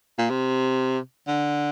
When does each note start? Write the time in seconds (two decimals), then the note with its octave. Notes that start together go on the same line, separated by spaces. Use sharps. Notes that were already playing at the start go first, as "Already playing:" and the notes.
0.19 A#2
0.30 C3
1.28 D3